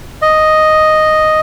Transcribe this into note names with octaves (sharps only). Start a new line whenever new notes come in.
D#5